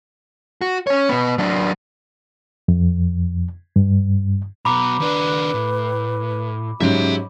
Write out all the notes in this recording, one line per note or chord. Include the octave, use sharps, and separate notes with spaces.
F#4
C#4 C#5
B2 B3
F#3 D4
F2
G2
B1 B2 A#5 B5 D6
D#2 D4 B4
A2
G#2 C#3 F#3 G4 E5 C6